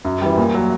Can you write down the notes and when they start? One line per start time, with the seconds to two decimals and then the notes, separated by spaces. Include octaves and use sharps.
0.05 F#2
0.21 E3 G3
0.37 A#2
0.54 F#3